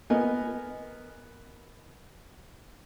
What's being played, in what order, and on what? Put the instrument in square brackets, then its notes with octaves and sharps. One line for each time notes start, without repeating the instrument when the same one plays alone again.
[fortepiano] B3 A#4 D#5 G#5